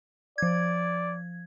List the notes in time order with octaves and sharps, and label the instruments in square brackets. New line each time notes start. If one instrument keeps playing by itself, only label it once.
[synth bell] F3 G#6 [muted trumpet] D5